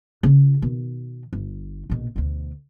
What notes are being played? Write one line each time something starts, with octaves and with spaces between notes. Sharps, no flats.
C#3 F4
B2 D#3
G1
A#1 B2
D2 B2